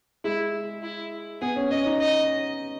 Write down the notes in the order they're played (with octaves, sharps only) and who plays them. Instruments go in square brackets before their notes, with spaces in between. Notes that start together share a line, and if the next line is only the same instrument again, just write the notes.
[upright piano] G#3 [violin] E4
[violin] E4
[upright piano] B3 [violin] G#4
[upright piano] C#4
[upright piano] C#4 [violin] D#5
[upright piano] D#4
[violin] D#5